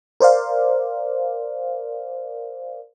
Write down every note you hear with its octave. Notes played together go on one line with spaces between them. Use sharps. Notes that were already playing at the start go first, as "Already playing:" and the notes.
A#4 C5 D5 F5